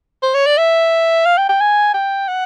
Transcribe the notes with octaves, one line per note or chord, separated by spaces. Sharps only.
C5
C#5
D5
E5
F5
G5
G5
G#5
G5
F#5